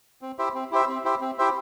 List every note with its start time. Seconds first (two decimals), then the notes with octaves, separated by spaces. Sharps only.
0.22 C4
0.39 E4 G4 C5 E5
0.54 C4
0.71 E4 G4 C5 E5
0.88 C4
1.04 E4 G4 C5 E5
1.21 C4
1.38 E4 G4 C5 E5